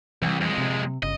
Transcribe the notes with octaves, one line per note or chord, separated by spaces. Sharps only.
C2 E3 G3
F2 G#3
C3
G1 C#3 D#5